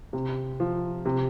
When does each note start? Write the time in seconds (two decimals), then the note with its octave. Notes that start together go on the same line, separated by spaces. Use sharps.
0.13 C3
0.60 F3
1.05 C3